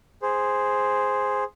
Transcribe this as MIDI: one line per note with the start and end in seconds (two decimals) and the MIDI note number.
0.22 1.44 68
0.22 1.44 72